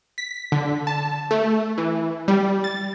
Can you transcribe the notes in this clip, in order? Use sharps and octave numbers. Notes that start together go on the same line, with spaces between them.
B6
D3
A5
A3
E3
G3
A6